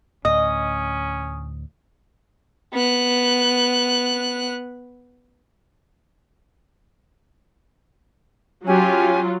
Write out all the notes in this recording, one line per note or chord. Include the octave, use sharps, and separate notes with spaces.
D2 A2 C#4 D#5 D#6
B3 F#6
F#3 C#4 F4 G4 G#5